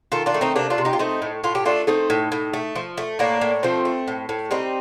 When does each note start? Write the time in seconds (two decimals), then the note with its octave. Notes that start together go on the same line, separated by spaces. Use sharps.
0.12 D#3 F4 A4
0.26 D4 F4
0.34 A3
0.41 C4 D#4
0.56 C3 A#3 D4
0.70 D4 F4
0.78 C3
0.85 D#4 G4
0.93 F4
0.99 A3 C4 D#4
1.22 A2
1.44 A2 F4
1.55 G4
1.65 A3 D4 F4
1.87 A3 C4 D#4
2.10 A2
2.32 A2
2.53 A3
2.75 F3
2.97 A3
3.19 A2 A#3 D4
3.41 A2
3.63 F3 A3 C4
3.85 A3
4.08 A2
4.29 A2
4.51 G3 C4 D#4